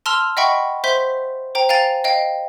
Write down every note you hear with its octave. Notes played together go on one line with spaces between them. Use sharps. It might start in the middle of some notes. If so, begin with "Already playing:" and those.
A5 C6 E6 F6 F7
D#5 E5 F#5 G5 B5 C#6
C5 E5 C6 G6 B6
C5 G5 A#5
F5 G5 G#5 A#5 A6 F7
D#5 F5 G5